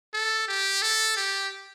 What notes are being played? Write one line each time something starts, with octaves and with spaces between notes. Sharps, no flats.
A4
G4
A4
G4